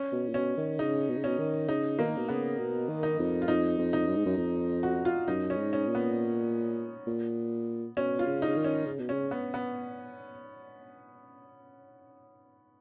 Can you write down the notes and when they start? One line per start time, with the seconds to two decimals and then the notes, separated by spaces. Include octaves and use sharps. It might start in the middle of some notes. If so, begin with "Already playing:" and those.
Already playing: C#4
0.12 B2
0.29 A#2
0.34 B2 C#4
0.57 D#3
0.79 C#3 D#4
1.09 B2
1.17 C#3
1.24 B2 C#4
1.39 D#3
1.69 C#3 D#4
1.99 D#3 A#3
2.17 B2
2.28 C#3 B3
2.59 B2
2.88 D#3
3.03 D#4
3.19 F2
3.42 F4
3.48 F2 D#4
3.78 F2
3.93 D#4
4.07 F#2
4.17 G#2
4.26 F#2
4.37 F2
4.83 F#4
5.05 F4
5.28 F#2 D#4
5.50 C#4
5.58 G#2
5.73 C#4
5.87 A#2
5.95 B3
7.07 A#2
7.97 B2 C#4
8.19 F4
8.27 C#3
8.42 D#4
8.48 C#3
8.57 D#3
8.64 C#4
8.86 C#3
8.99 B2
9.09 C#3 C#4
9.31 B3
9.54 B3